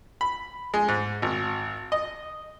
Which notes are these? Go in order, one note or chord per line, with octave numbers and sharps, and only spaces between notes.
B5
G#3
G#2
G#1
D#5